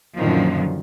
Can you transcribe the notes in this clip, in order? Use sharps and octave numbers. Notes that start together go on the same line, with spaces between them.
F#2 A#2 D3 D#3 F3